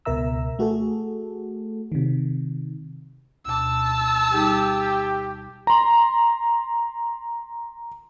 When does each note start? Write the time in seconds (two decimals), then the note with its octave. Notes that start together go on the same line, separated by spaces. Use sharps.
0.05 C#2 B2 A#4 E5 A#5 E6
0.59 A3 F#4 G#4 A4
1.92 C3 D#3
3.45 D2 B2 A5 D6 E6
4.33 G3 D#4 G4 G#4
5.67 A#5 C6